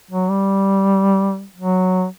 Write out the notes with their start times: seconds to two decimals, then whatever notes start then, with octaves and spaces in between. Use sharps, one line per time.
0.11 F#3
0.30 G3
1.57 F#3